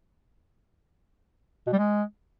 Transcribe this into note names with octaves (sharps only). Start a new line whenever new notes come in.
B2
G3
G#3